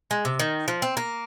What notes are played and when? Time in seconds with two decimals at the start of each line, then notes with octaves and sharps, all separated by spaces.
0.11 G#3
0.25 C3
0.39 D#3
0.68 F3
0.82 C4
0.97 A#3